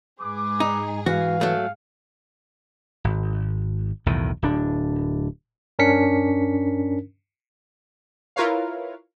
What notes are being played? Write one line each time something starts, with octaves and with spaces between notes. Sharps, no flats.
G#2 G#4 B4 D6
D#4
E3 F#4 F5
F#3 A3
G#1
B1 E2 A2 D#3
D1 D4
G2 C#4 D4 A#4 B6 C#7
E4 F4 A#4 B4 C#5 F5